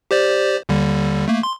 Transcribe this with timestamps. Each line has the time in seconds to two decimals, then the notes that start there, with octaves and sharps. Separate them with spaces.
0.11 G4 C5 D5
0.69 D#2 D3 G3
1.28 A3 A#3
1.43 C6